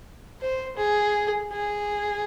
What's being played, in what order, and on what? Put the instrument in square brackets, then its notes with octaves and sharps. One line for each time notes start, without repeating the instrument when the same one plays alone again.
[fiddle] C5
G#4
G#4